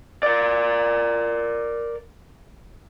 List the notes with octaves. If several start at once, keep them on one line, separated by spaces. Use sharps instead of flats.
A#4 D5